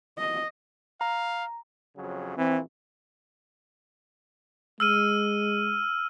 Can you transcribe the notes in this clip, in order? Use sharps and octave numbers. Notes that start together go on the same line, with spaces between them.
D#5
F5 A#5
F2 C#3 F#3
A#1 E3 C4
G#3 E6 F6 D#7